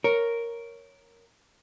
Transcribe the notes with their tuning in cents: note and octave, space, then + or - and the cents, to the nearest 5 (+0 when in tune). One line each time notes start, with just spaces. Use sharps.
A#4 +0 C#5 +0